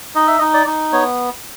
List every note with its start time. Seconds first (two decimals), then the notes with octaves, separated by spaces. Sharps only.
0.15 D#4 D#5
0.27 E5
0.39 D#4 D#5
0.54 D5
0.67 D#4
0.93 B3 C#5